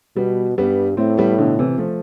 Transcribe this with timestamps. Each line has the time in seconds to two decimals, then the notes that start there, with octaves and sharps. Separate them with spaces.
0.16 B2 G3 B3
0.57 G2 G3 B3
0.97 A2 A3 C4
1.17 G3 B3
1.38 B2 D3
1.59 C3 E3
1.78 F3 A3